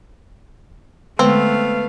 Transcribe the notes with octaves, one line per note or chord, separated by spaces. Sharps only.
D3 G#3 A3 B3 C4 F5